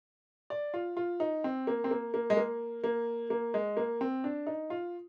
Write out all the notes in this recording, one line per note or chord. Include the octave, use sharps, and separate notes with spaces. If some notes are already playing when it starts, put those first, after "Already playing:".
D5
F4
F4
D#4
C4
A#3
C4
A#3
A#3
G#3
A#3
A#3
A#3
G#3
A#3
C4
D4
D#4
F4